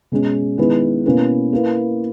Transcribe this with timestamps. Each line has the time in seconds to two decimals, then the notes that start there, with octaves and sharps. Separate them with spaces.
0.12 B2 G#3 C#4
0.58 D#3 G#3 B3 E4 B4
1.05 B2 A#3 C#4 E4 B4
1.53 A#3 E4 B4